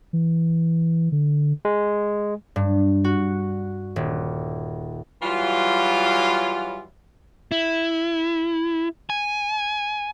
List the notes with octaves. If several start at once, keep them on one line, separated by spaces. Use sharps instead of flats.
E3
D3
G#3
G2
F#4
D#1
E3 F#3 G3 F4
E4
G#5